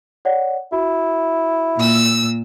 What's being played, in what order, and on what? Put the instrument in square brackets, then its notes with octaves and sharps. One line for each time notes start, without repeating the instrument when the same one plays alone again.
[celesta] C#5 D5 F#5
[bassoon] E4 [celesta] F#4
[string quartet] A#2 E6